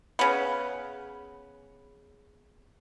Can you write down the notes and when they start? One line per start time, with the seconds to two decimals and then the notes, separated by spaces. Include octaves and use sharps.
0.19 C#3 B3